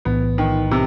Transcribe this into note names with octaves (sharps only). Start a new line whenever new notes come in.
B1 A2 E3 B3
D#3
C3